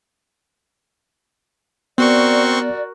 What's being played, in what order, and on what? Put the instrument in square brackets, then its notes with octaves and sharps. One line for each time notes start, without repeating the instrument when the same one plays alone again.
[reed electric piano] B3 [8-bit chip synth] C4 C6 C#6 [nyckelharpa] F#4 A#4 [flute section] D5